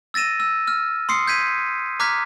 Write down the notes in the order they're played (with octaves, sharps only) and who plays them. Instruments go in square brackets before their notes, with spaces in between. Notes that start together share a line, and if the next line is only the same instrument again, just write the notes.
[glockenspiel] E6 A6 A#6 D#7 E7
E6
E6 F6
C6 D#6 C7 C#7
G6 G#6 B6 D#7
A#5 D6 F6 F#6 G#6 B6